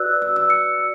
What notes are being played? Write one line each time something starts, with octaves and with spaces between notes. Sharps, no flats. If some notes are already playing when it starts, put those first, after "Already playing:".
Already playing: F#4 B4 D5 E6 F#6
E6
E6
C#7
D5